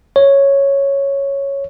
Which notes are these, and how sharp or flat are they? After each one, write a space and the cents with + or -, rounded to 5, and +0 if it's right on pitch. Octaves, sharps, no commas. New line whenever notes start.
C#5 -5